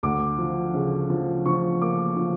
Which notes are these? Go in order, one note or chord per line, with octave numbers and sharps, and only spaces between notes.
D2 D6
F3
C#3
F3
F3 C#6
A#3 D6
F3